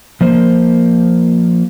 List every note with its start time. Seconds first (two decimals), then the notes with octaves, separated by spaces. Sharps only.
0.21 F3 A#3 C5